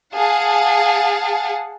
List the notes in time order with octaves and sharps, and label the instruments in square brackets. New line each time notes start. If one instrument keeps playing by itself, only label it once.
[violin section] G#4 F5 F#5 A5